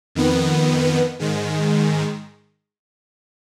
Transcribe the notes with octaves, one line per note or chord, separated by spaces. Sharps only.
F2 D#3 B3
G#2 D#3 G#3